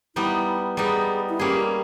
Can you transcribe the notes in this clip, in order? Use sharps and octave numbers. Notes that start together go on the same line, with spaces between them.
G3 B3 D#4 E4
G3 B3 D#4 G#4
E4
G3 A#3 C#4 G4 G#4